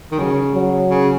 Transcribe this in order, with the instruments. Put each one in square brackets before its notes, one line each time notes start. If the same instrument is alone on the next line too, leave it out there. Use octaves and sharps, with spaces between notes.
[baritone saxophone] D#3
[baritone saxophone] C#3 [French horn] F#3
[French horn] F#3
[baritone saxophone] C#3